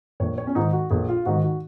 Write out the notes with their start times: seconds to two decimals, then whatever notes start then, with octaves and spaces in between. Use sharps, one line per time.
0.20 A#1 C#5
0.38 C#5
0.47 C#4
0.55 G#2 D#3 D#4
0.73 F#4
0.90 A#1 G#4
1.09 F4
1.25 G#2 D#3 F#4
1.43 F#4